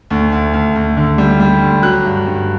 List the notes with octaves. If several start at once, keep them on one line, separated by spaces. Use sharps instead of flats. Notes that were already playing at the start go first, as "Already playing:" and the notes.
D2
D2
D2
D2
D3
G3
G3
D2
F#3 F#6
G2
G2